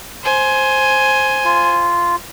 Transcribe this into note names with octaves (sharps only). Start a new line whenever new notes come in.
C5 G#5
F4